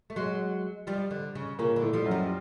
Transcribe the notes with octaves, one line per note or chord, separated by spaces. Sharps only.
A3
F#3 G#3
F3 G3
D3
C#3
A#2 C#3 A#3
D3
A2 A3
F3 G3
F#2 F#3
F3 G3